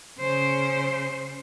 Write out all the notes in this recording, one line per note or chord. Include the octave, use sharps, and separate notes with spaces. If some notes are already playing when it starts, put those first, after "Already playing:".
C#3 C5